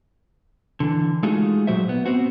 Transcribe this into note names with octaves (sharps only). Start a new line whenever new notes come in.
D3 E3
G#3 A3 D#4 F4 F#4 G#4
A#2 F#3 F#4 C5 E5
B3
B3 C4 F#4